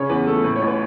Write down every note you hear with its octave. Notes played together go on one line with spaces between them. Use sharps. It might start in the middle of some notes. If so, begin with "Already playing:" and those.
Already playing: C#3 C#5
E2 B4
A3 A4
A2 B4
C#5
A1
B4